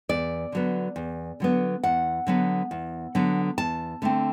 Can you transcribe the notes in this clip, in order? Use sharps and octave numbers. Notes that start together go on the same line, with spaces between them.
E2 D5
D3 F#3 B3
E2
D3 F#3 B3
E2 F#5
D3 F#3 B3
E2
D3 F#3 B3
E2 A5
D3 A3 C4